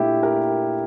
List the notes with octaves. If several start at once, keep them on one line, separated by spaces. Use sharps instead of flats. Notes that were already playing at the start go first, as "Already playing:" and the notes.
Already playing: A#2 A3 D4 E4 G4
G4 A#4